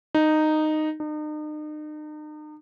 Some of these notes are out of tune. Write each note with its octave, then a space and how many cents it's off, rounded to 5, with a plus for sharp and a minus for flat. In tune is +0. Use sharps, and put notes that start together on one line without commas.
D#4 -10
D#4 -40